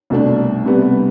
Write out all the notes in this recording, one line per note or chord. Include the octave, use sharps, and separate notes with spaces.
C2 B2 A3 D4
C3 G3 B3